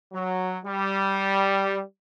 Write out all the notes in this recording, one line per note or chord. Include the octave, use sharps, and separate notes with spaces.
F#3
G3